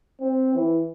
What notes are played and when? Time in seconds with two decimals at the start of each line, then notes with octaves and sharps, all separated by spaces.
0.20 C4
0.54 E3